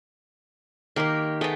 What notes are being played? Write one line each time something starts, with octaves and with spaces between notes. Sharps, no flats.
D#3 A#3 G4 A#4 C6
A3 B3 G#4 D#5 G5